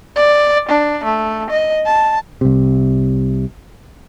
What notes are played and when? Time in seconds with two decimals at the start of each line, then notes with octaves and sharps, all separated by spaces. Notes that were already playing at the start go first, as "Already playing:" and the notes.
0.16 D5
0.69 D4
1.04 A3
1.50 D#5
1.86 A5
2.41 C2 C3